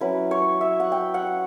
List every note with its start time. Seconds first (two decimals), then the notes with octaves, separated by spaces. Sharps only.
0.01 F#3 C#4 E4 B4
0.31 C#5
0.61 E5
0.80 F#5
0.92 G5
1.14 F#5